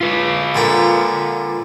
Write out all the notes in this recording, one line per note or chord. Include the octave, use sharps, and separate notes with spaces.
F4 B4
A#2 D3 G5